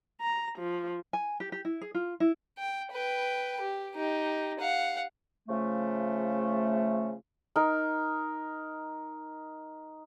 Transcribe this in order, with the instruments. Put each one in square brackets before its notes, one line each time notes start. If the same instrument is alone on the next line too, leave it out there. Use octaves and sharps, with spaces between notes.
[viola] A#5
F3
[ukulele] G#5
G4
G4
E4
G#4
F4
E4
[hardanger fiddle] G5
B4 G5
G4
D#4 G4
F5 F#5
[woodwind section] C#3 F3 A3
[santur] D#4 A#4